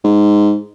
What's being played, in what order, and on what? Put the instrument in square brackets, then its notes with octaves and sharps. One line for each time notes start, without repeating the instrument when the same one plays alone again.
[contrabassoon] G#2